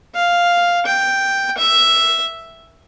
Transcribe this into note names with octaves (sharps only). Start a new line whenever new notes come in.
F5
G5
E5